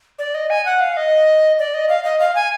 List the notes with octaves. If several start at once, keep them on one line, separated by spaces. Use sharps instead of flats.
D5
D#5
G#5
F#5
F5
D#5
D5
D#5
F5
D#5
F5
G#5